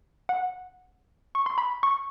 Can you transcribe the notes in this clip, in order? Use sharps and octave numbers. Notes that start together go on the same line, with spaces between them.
F#5
C#6
C6
B5
C#6